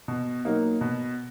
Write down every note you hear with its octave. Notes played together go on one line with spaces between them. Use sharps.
B2
F#3 A#3 D#4
B2